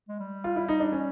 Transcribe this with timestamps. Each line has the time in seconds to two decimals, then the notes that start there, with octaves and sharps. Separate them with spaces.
0.09 G#3
0.19 G3
0.44 F4
0.56 E4
0.68 D#4
0.80 D4
0.92 C#4